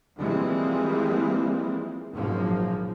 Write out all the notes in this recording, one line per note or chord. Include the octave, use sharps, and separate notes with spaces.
E3 F3 G3 G#3 A#3 C4
G#1 F#2 A#2 F3 A#3